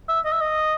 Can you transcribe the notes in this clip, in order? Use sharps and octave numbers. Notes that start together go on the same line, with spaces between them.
E5
D#5
E5
D#5